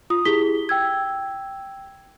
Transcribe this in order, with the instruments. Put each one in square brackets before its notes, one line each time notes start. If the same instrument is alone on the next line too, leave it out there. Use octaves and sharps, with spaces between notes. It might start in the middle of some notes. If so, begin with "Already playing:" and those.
[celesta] F4 D#6
E4 G4 G#4 B6 G7
G5 E6 G#6